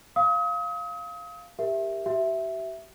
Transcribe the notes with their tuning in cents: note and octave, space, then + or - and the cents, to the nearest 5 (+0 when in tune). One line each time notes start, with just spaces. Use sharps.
F5 +0 D#6 +40
G4 +15 A#4 +0 E5 +0
G4 -45 E5 +0